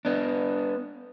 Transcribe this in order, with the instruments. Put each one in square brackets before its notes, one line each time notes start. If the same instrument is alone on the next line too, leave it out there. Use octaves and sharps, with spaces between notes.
[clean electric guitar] B3 D4